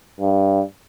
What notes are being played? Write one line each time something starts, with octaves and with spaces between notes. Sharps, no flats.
G2